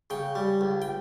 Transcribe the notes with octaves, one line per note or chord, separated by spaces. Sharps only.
C#3 G5
G3
C#2
G5